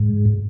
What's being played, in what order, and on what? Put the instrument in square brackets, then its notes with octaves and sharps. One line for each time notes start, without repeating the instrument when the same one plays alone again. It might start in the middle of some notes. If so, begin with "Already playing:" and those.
Already playing: [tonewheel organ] G#2